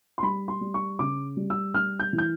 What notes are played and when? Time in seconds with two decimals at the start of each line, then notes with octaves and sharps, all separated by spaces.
0.18 C6
0.23 G3 B5
0.48 C6
0.61 G3
0.74 C#6
0.99 C#3 D6
1.37 G3
1.50 E6
1.74 G3 F6
1.99 G6
2.13 E3
2.18 G6